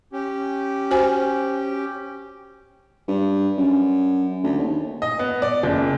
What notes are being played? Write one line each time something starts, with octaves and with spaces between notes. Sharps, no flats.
C#4 G4
F#4 C5 G#5
G2
F#2
D2
D#2
D#5
B3
D5
F#1